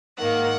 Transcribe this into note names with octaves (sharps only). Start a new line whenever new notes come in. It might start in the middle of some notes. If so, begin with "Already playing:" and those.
G#2 D#3 A#3 F#5